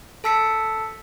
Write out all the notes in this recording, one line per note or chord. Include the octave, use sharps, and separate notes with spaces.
A4 A5 E6 B6 C#7